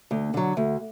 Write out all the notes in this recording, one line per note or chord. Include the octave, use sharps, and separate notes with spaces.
D2
D3 F#3
D2